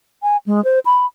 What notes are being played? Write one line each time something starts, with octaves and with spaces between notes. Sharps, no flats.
G#5
G#3
C5
B5